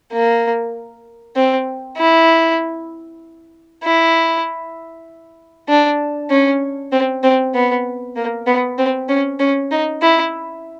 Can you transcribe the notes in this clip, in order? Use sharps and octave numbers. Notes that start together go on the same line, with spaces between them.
A#3
C4
E4
E4
D4
C#4
C4
C4
B3
A#3
B3
C4
C#4
C#4
D#4
E4